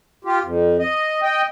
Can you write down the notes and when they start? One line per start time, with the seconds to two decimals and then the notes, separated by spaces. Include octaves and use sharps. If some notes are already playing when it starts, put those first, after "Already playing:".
0.25 F4 G4
0.42 F2
0.79 D#5
1.23 D#5 G5